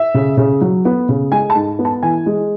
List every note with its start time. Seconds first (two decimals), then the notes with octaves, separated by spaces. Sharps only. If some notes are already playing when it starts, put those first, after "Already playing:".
Already playing: E5
0.14 C#3
0.37 C#3
0.61 F#3
0.85 B3
1.09 C#3
1.32 G#3 G#5
1.50 A5
1.55 G#2
1.79 B3
1.85 A5
2.03 E3 G#5
2.26 G#3